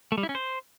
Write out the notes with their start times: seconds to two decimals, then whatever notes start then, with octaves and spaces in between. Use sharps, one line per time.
0.12 A3
0.18 G3
0.23 E4
0.29 C#4
0.35 C5